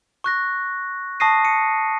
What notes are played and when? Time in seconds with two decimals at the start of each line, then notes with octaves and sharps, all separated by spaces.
0.24 C#6 F#6 A#6
1.20 A5 C#6 D#6 A#6 C7 D#7
1.45 C#7 D#7